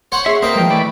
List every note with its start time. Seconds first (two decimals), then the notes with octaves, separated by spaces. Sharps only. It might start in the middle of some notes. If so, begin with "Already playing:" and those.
0.12 C5 C#5 F#5
0.26 G#4 E5 C6
0.42 A#3 C4 B4 D#5
0.56 F3 G#3 G5
0.70 E3 A3 D5 B5